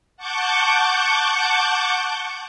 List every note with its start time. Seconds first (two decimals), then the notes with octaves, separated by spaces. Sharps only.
0.17 F#5 A5 C#6 D6 G6